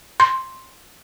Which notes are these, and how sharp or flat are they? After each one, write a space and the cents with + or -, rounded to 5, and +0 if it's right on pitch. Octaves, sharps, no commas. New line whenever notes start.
C6 +5